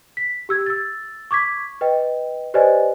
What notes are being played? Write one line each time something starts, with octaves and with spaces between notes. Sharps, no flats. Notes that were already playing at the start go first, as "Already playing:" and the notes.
B6
G4 E6 G#6
E6 A6
C#6 D6 G#6 B6
B4 D#5 G5
G4 B4 C5 D5 D#5 G#5